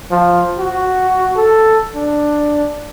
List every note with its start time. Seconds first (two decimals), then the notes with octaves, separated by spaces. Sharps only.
0.10 F3
0.59 F#4
1.36 A4
1.94 D4